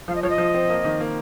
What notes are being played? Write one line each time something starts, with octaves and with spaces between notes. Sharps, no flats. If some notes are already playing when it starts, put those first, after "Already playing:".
F3 F5
D#5
F3 C#5
D#5
F3
C4
A#3
D#3
A#3